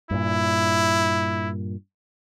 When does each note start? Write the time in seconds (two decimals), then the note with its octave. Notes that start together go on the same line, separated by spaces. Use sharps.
0.11 G2 A#2 E4